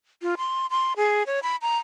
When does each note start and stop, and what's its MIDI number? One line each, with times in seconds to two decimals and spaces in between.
0.22 0.35 65
0.38 0.66 84
0.70 0.93 84
0.97 1.23 68
1.27 1.40 73
1.43 1.56 83
1.62 1.78 82